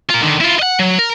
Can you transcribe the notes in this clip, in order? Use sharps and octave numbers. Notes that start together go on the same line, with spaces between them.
F4 A#4
D3 D#3
E4 F4
D#5 F#5
F#3
A#4